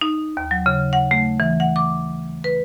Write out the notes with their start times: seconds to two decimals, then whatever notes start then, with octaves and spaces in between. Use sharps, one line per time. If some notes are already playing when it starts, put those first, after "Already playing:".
0.01 D#4
0.37 D#2
0.51 F#3
0.66 C#3
0.93 F#5
1.11 A3
1.40 E3
1.60 F#5
1.76 D6
2.44 B4